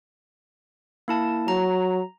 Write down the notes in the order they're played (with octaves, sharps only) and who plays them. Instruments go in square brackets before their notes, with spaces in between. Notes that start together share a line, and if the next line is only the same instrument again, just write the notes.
[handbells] A#3 E4 A5
[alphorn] F#3 [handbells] A#5